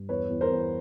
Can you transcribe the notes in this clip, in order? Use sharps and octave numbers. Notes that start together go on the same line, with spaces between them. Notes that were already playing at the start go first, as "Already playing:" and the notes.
Already playing: G2
E2 B4 C#5
E2
A#4 C5
E2